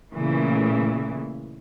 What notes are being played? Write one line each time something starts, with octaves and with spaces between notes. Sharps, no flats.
A#2 C#3 E3 A3